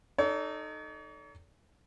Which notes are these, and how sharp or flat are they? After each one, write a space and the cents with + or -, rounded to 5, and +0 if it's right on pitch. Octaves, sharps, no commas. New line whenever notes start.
D#4 -15 A4 +0 C#5 +45